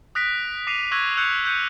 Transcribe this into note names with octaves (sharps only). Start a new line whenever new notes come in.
D#6 F#6 A#6 B6 D7
D6 D#6 A#6 C7 D#7 F7
C#6 E6 F#6 G#6 A#6 D#7
E6 F#6 G6 C#7 F7
E6 F#6 G6 C#7 D#7